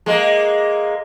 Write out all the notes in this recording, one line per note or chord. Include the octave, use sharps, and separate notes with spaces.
G#3 A#3